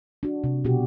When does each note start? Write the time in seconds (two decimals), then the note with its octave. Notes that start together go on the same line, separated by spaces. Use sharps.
0.23 D4 F#4
0.44 C3
0.65 B2 F#4 G4